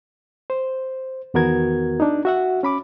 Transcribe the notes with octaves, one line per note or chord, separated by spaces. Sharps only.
C5
E2 D#3 B3 F#4 A#4 G#6
D4 D#4
F#4 E5 F#5
C#4 B5 D6